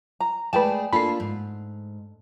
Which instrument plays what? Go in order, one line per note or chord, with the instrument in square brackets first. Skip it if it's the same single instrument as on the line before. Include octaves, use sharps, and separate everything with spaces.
[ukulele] A#5
[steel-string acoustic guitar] G#3 A3 G#4 [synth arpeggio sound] B4 E7 [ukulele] D5 G5 A5
[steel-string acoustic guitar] A#3 D4 F4 [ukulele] A4 [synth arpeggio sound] B5 C7
[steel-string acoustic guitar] G#2